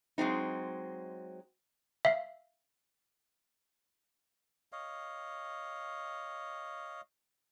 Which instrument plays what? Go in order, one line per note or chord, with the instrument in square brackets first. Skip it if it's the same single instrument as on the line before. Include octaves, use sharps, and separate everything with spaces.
[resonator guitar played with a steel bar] F#3 G#3 C4 D#4
[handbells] E5 F5
[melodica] C#5 D#5 F5